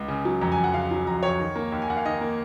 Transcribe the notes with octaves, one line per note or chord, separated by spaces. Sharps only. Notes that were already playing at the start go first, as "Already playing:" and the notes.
Already playing: C#2
C#3
F#3
F2 A#5
G#5
F2
F#5
C#3 F5
F#3
F2 A#5
F2 C#5
D#3
A#3
D#2
G#5
D#2 F#5
F5
D#3 D#5
A#3